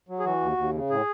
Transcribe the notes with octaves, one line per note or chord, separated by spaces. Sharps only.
F#3
G#4
E3 F#4
D#2
D#2
C#3
A2 G#4